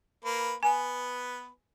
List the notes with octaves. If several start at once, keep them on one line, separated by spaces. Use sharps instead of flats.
A#3 B4
B3 B4 G#5